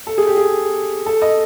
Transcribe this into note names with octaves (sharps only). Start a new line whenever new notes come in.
A4
G#4
G4
G#4
A4
D#5